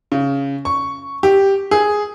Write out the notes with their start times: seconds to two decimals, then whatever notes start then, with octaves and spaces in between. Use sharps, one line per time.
0.12 C#3
0.65 C#6
1.23 G4
1.71 G#4